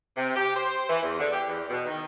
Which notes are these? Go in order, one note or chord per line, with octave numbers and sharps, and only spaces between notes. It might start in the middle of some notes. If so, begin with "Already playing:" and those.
C3
G4
C5
E3
E2
D3
G4
E2
B2
D#3